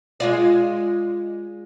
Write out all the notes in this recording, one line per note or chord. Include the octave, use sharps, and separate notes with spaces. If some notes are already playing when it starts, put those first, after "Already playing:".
G#3 F4 D5